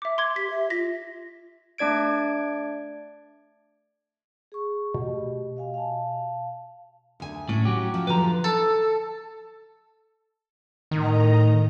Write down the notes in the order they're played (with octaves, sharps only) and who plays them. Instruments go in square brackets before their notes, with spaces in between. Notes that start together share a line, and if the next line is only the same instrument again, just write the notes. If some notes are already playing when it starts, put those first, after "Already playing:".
[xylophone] E5 D6
C6 D6 G#6
[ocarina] G4 [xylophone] B6
[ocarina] E5
[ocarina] F4 [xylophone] A#6 B6
[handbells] A3 D4 D5 G#6 D7
[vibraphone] G#4 C#6
[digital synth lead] B2 [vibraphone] A3 G4
[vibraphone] D#5 F5 G#5
F5 A5
[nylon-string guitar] D2 G#5
[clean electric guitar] A2 [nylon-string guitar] C#4
[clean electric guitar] F#3 F#4 G4
[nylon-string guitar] F3
[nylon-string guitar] D3 F3 [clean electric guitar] B4 A#5
[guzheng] A4
[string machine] A2 D#5 A#5 [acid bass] D#3